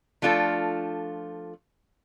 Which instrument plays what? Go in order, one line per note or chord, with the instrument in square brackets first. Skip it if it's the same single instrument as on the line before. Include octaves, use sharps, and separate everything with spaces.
[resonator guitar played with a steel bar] F3 A3 D4 F4 A4